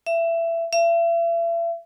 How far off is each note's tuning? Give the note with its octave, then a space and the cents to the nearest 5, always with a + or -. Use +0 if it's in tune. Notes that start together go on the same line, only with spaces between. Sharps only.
E5 +20
E5 +40